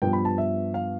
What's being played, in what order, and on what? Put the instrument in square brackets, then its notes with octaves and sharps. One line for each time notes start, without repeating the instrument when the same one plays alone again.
[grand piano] G2 F3 B3 G5
B5
A5
E5
F5